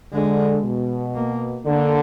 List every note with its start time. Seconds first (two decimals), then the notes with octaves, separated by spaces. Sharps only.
0.12 D3 G#3
0.64 B2
1.15 A#3
1.66 D3 A#3